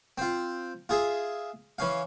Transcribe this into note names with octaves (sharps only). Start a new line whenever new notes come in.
C4 F4
F4 G#4 E5
E3 C#4 F5